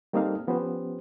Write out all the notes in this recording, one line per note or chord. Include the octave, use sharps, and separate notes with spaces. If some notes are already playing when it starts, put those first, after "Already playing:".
G3 A#3 C4 D#4 A4 F5
F3 B3 C#4 G4 C5